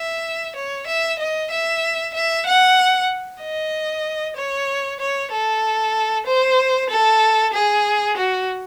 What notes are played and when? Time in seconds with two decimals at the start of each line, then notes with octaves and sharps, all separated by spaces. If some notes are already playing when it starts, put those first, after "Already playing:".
Already playing: E5
0.56 C#5
0.87 E5
1.19 D#5
1.51 E5
2.14 E5
2.46 F#5
3.41 D#5
4.36 C#5
5.00 C#5
5.31 A4
6.26 C5
6.90 A4
7.53 G#4
8.17 F#4